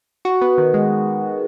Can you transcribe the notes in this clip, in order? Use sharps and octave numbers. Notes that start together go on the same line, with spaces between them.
F#4
B3
D#3
G#3